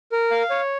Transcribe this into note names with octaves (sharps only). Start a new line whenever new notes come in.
A#4
F5
C#5